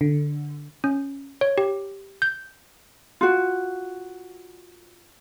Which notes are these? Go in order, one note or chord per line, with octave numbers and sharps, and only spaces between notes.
D3
C#4
C#5
G4
G6
F4 F#4